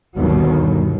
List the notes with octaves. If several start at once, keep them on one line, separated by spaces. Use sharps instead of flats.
G1 D#2 B2 D#3 F#3